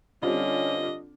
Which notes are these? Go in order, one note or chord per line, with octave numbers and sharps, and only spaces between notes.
D3 G3 C4 C#4 F4 D#5